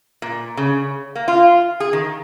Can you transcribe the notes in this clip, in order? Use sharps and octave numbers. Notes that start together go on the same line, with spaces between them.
A#2
C#3
A#3
F4
G#4
D#3